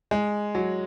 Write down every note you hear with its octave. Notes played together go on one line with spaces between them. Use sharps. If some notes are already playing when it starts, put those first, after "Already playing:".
G#3
F#3